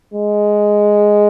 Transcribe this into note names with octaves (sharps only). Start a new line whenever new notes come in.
G#3